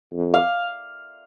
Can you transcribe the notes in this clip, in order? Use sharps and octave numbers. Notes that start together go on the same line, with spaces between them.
F2
F5